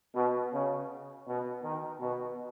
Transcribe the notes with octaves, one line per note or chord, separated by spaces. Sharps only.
B2
C#3
B2
D#3
B2